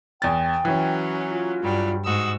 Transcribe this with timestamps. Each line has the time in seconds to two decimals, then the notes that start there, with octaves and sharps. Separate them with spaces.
0.22 E2 G5 A6
0.65 E3 F#3 C#4
1.30 F4
1.62 G2 F#3 G3
2.05 G#2 F#4 D#6 E6